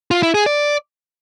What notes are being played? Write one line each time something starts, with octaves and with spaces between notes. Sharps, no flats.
F4
E4
G#4
D5